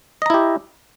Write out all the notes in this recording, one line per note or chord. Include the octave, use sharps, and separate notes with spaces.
E4 G4 D#5 A#5